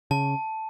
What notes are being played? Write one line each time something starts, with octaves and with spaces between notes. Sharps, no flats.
C#3 A5